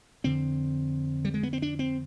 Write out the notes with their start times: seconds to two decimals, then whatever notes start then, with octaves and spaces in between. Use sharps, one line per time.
0.24 F2 D3 C4
1.25 G3
1.34 G#3
1.43 B3
1.53 C4
1.62 D4
1.79 C4